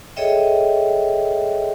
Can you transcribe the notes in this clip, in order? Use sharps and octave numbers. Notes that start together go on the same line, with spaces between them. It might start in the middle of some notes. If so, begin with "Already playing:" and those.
G#4 A4 C#5 D#5 E5 G5